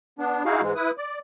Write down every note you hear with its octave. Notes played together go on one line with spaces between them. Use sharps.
B3 D4
D#4 E4 F#4 G#4 F5
G#2 E3 G#3
E4 B4 D#6
D5